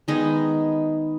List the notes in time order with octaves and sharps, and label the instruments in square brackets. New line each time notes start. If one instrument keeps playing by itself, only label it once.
[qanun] D#3 G#3 B3 D#4